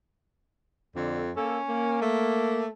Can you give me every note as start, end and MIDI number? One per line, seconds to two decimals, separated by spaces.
0.96 1.31 41
0.96 1.22 50
1.36 1.58 58
1.36 1.97 61
1.36 1.58 69
1.68 2.64 58
2.02 2.68 57